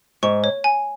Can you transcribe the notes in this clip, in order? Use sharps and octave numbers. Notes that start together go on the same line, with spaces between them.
G#2 C#6
C#5
G#5